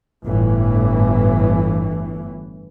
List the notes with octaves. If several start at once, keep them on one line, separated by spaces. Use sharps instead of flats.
G1 A2 E3